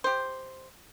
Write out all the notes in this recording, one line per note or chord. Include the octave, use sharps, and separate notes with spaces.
G4 C5